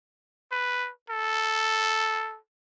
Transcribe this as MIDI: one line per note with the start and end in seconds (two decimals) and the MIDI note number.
0.51 0.90 71
1.09 2.38 69